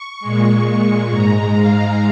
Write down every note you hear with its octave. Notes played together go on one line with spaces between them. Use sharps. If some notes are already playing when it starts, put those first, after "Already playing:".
Already playing: C#6
A#2 G#3
G#2 G#3 A#5
F5